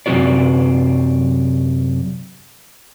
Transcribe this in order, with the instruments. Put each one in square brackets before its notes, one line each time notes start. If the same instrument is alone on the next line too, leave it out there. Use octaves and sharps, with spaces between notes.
[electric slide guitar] F#2 C3 G#3 E4 F#4 D5